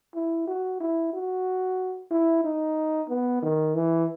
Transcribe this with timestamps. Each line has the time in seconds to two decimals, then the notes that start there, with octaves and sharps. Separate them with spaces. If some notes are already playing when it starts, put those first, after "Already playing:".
0.15 E4
0.47 F#4
0.80 E4
1.13 F#4
2.11 E4
2.44 D#4
3.10 B3
3.42 D#3
3.75 E3